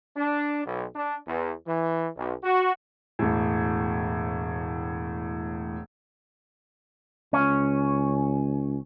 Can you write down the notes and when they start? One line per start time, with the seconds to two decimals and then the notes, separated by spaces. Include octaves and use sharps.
0.17 D4
0.66 B1
0.95 D4
1.26 E2
1.66 E3
2.15 B1
2.43 F#4
3.19 E1 A2
7.33 C#2 C#4